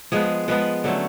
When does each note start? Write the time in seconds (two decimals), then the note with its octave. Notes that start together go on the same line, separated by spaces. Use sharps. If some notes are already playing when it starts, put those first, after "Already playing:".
0.12 F3 G#3 B3 G#4
0.48 F3 G#3 B3 B4
0.84 D3 F#3 A3 C#4